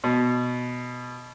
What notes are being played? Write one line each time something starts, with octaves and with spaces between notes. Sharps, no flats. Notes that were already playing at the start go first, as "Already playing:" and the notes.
B2